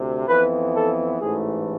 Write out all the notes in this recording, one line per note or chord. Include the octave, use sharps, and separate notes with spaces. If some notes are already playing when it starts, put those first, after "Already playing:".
Already playing: D2 C3
F2 E3 B3 B4
A4
A1 G#2 E3 A3 G#4